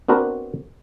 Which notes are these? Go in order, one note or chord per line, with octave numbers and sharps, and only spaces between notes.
B3 C4 D4 F#4 A#4 B4